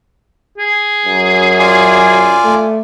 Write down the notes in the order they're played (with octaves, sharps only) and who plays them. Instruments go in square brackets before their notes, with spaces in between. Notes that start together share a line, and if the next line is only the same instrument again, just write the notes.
[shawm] G#4
[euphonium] F#2
[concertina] F4 D5 G#5
[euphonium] A3